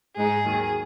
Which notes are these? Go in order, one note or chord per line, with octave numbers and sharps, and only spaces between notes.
G#2 G#3 D#4 G#4
D#2 D#3 F#3